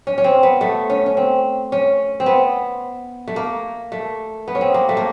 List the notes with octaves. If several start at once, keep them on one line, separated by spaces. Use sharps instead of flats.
C#4
C#4
C4
B3
A3
C#4
C#4
C4
C#4
C4
B3
A3
A#3
A3
B3
C#4
C4
A#3
A3
A#3